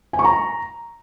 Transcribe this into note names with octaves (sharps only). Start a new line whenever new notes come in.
G#5
C#6
A#5